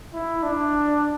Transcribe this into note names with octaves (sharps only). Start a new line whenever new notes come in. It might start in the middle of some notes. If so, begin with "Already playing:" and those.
E4
D4